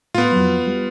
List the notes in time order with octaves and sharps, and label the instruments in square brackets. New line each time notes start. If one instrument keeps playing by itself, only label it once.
[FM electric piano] A2 [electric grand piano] B3 F4
[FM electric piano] F2 F#3
G3